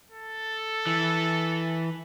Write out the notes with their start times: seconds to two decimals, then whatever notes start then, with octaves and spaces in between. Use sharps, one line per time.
0.11 A4
0.87 E3